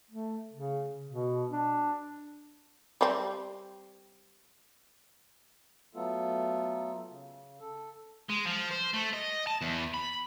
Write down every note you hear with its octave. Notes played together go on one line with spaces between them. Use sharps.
A3
C#3
B2
D4
G3 C4
F#3 A3 B3 F4 A4
C#3
A4
G#3
F3
C5
A3
D#5
A5
E2
B5